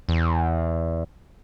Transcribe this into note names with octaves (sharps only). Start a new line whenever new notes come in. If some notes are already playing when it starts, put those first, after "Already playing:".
E2